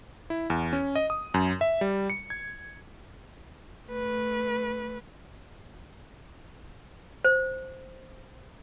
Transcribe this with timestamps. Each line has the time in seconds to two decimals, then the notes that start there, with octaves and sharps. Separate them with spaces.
0.30 E4
0.50 E2
0.73 C#4
0.95 D#5
1.10 D#6
1.34 F#2
1.61 E5
1.81 G3
2.10 C#7
2.30 G#6
3.88 A3 B4
7.24 C5